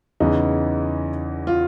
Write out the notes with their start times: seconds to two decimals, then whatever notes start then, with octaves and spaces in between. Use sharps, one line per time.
0.20 E2 C#3 E3 D#4
1.47 F4